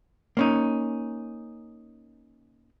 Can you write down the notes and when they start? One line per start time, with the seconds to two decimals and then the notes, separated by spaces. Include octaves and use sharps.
0.37 A#3 C#4 D#4